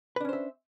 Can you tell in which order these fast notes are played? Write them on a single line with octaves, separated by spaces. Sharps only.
B4 D4 C#4 C5 E5